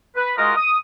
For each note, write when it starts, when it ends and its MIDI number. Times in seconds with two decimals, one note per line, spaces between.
0.17 0.33 71
0.38 0.53 56
0.38 0.53 65
0.38 0.53 66
0.38 0.53 70
0.38 0.53 75
0.57 0.78 87